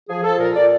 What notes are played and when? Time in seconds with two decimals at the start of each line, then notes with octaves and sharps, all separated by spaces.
0.09 F3 G#4
0.24 F3 A4
0.40 A#2 A#4
0.55 A#2 D5